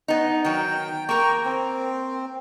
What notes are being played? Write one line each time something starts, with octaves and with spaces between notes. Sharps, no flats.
B3 D#4
D#3 F#3 G5
A#3 A#4 G5 C#6
C4